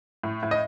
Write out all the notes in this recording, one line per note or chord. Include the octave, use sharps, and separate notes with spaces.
A2
A2
D#5